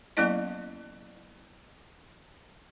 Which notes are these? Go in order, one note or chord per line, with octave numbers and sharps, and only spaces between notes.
F#3 A#3 B3 C#4 E4 D#5